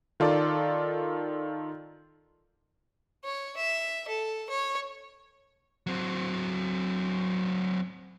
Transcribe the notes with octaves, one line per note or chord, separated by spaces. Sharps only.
D#3 F4 A4 D5
C#5
E5
A4
C#5
F#3 C4